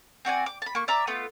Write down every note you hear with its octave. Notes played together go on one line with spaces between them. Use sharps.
C4 F#4 D5 G#5
D6
A5 B5
A#3 C#6
D5 E5 A#5 D6
A3 B3 F4